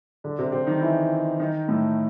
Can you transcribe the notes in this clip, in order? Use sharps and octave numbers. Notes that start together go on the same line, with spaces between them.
D3 D4
C3 C4
C3 C4
D#3 D#4
E3 E4
D#3 D#4
A2 A3